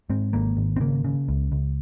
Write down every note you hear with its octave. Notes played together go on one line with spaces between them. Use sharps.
G#2 C4
G#1 A#3
G#1
C4
C#3 A#3
C#3
C#2
C#2